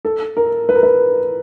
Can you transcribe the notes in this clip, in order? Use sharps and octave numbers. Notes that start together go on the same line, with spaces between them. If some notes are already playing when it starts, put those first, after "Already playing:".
A4
A#4
B4
A#4
B4